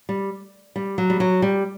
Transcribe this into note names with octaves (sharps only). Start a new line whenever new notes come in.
G3
G3
F#3
G3
F#3
G3